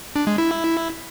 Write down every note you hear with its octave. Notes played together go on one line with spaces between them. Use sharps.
D4
G#3
E4